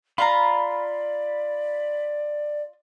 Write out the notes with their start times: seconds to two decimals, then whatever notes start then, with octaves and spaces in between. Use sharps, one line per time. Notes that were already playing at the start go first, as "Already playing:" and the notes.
0.18 F4 D5 F5 A#5 B5